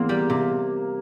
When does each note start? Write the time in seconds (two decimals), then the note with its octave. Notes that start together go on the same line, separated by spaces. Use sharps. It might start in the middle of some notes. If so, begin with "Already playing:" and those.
Already playing: E2 A#3 C4
0.09 G3
0.30 C3